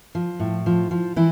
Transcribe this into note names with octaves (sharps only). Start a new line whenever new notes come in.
F3
A2
F3
F3
E3 E4